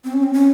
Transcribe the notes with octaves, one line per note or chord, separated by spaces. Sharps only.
C4
C#4
C4
C#4